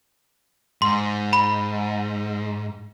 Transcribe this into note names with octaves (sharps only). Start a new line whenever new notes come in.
G#2 C6
B5